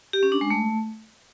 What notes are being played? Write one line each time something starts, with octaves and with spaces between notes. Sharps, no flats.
G4
C#4
D4
G#3
A3